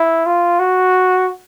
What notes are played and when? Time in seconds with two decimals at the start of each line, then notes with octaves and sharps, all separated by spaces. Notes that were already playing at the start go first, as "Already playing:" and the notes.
Already playing: E4
0.26 F4
0.59 F#4